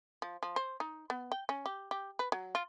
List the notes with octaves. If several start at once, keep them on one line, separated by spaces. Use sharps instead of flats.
F3
F3
C5
D#4
B3
G5
C#4
G4
G4
B4
F#3
F4